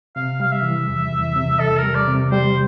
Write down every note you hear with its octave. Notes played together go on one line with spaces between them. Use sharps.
C3 F5
G3 F5
E5
E3
E2
E2
C3
E2 A4
A#4
G3
D5
C3
G3 C5